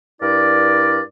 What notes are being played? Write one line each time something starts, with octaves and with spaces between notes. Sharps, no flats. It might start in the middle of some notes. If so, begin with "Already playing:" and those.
G2 E4 A#4 D5